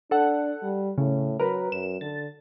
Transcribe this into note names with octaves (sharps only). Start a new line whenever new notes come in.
D4 A4 F#5
G3
A2 C#3
F#3 A#4 B4
F#2 E7
D3 A6